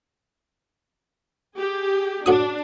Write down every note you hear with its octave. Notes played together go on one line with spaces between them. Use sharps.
G4 G#4
A2 D4 F#4 D#6